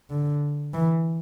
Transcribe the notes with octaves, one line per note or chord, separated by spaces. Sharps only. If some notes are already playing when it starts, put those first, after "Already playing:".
D3
E3